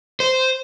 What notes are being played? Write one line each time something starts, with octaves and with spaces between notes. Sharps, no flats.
C5